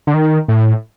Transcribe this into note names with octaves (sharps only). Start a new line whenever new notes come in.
D3
D#3
A2